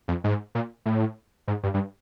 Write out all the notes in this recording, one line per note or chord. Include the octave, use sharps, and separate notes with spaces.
F2
G#2
A#2
A2
G#2
G2
G2